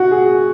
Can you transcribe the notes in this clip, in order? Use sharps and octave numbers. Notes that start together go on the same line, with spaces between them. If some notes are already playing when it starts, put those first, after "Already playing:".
Already playing: F#4
G#4